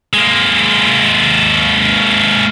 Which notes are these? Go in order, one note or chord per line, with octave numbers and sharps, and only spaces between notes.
G#3 A#3